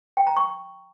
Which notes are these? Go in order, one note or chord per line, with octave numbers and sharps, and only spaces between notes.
G5
A#5
C#6